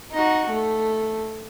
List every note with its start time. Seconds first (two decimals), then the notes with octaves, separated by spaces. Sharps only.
0.12 D#4 F#4
0.49 A3